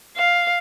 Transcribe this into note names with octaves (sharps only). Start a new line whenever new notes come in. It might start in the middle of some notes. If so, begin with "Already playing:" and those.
F5